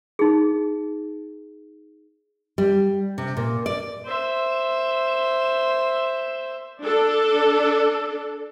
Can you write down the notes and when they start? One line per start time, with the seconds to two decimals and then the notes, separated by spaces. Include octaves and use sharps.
0.19 D#4 G#4
2.58 G3
3.18 C3
3.37 A#2
3.66 D5
4.05 C5 E5
6.83 D4 A4